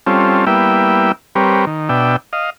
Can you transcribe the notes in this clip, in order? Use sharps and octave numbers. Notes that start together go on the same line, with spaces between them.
G3 C4 C#4 F4 A4
G3 A#3 B3 E4 E5 G5
G3 C4 G4 A#4 B4 C#5
D#3
B2 D4 E5 G5
D#5 F5